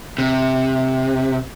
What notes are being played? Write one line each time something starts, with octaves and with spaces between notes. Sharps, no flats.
C3